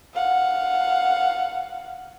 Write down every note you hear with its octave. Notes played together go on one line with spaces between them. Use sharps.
F5 F#5